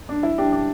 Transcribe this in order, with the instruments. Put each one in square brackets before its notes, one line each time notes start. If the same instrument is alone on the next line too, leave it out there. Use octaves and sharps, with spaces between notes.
[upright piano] D4
E4
D4 G4
D4